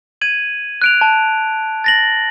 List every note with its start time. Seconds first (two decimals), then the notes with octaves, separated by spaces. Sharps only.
0.21 G#6 D#7 F#7
0.82 F#6 D7 F7
1.01 A5
1.84 A6 A#6 F#7